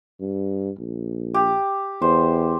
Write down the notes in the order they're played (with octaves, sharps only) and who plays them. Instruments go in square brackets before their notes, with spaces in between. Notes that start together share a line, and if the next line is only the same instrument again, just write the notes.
[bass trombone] G2
A#1
[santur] G4
[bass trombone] E2 [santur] C5